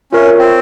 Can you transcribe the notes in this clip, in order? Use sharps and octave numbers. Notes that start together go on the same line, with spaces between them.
C#4 F4 A#4 C#5 E5
C4